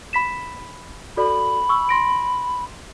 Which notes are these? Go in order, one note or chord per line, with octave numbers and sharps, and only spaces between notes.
B5 B6 E7
F#4 A4 D5 B5
C#6 E6
C6 A#6 D7